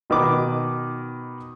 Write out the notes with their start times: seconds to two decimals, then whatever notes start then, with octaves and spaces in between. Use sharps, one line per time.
0.10 B2 D#3 B4 D6